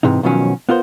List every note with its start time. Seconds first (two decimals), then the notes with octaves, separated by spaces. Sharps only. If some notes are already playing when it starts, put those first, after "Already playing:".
0.03 G#2 C3 E3 D#4
0.23 B1 B2 D#3 F3 F#3 C#4
0.69 B3 F4 A#4 C5